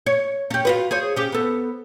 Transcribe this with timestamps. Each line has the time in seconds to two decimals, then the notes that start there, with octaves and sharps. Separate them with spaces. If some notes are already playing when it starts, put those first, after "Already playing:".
0.06 C#5
0.50 C#4 G4
0.65 F4 F#4 B4
0.91 G#4 C5 C#5
1.16 C#4 G4
1.32 B3 A4